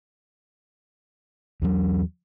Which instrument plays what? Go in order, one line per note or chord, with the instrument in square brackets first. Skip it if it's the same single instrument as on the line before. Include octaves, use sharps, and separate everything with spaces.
[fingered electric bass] E2 F#3